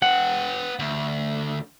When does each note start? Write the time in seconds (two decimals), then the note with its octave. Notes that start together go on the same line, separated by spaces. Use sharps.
0.02 B3 F#5 G5
0.79 D2